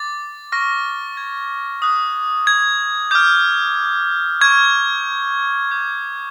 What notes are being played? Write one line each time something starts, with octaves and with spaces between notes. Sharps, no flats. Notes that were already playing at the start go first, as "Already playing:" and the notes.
Already playing: D6 A6
C#6 F6 A#6
G#6
D#6 F#6
G#6
D6 F6 G6
C#6 F6 G#6
D6 G6